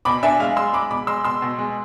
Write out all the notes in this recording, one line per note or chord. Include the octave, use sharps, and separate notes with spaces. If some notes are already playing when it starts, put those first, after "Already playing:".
B2 B5 D6
D4 E5 G#5
G#3 F5
G#3 C6 E6
G#3 B5 D6
B2 B5 D6
G#3 C6 E6
B2 C6 E6
B2
G#3